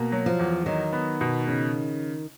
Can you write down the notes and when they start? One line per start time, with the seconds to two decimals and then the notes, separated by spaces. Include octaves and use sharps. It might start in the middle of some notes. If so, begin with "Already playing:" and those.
Already playing: B2 A#3
0.12 F#3
0.26 F3
0.39 E2
0.66 D#3 F#3
0.93 B3
1.21 B2
1.47 C#3